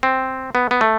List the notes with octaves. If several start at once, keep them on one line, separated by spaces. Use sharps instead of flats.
C4
B3
B3
A3